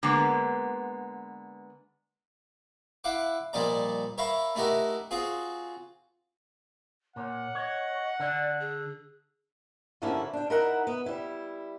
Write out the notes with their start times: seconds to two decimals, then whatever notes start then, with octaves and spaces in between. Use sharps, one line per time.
0.03 D3 G#3 A#3 B3
3.04 E4 F5 F#5 D6
3.53 A#2 F3 G3 D#4 D5 A#5
4.18 A#4 C#5 E5 F5 A#5 B5
4.55 A3 D#4 E4 F#4 G4 A#4
5.11 C4 F4 F#4 G#4
7.16 A#2 C#5 F#5
7.55 C#5 D#5
8.20 D3 D5
8.60 G#4
10.02 G2 D3 F3 A#3 C#4 E4
10.33 D4 G5
10.50 D#4 E4 A#4 E5 F#5 A#5
10.87 B3
11.06 G3 E4